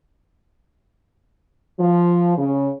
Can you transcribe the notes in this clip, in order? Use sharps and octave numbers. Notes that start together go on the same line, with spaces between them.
F3
C#3